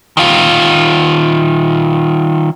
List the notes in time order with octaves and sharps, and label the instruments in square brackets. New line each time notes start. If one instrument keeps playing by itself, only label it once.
[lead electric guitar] D#3 F4